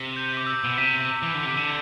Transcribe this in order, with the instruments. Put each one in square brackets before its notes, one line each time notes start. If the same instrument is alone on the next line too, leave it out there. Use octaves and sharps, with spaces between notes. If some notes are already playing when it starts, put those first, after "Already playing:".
Already playing: [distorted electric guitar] C3
[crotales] G6
D6
E6
[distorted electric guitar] B2
[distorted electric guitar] C3 [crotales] B6
[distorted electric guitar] E3
D3
C3
D3